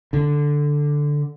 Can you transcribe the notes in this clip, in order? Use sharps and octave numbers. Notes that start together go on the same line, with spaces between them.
D3